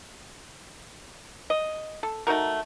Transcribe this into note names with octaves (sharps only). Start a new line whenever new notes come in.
D#5
A4
A3 D#4 F#4 A#4